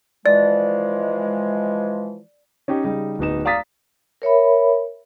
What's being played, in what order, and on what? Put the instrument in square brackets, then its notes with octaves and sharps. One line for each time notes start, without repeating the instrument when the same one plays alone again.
[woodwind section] E3 F3 G#3 [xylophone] D5
[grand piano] C#4 D#4 G4
C#3 G3 D#4
D1 B3 D#4 E7
D5 F5 A#5 D#6 A6 B6
[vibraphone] A#4 C#5 E5 B5